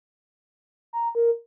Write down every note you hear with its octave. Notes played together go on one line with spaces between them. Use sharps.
A#5
A#4